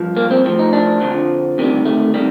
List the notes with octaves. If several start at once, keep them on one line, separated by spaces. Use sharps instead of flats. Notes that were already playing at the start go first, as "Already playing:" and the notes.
Already playing: G2 F3
A#3
C4
A2 F3
D#4
D4
F2 D3 F3
D2 C3 D#3 G3
A3
C3 D#3 G3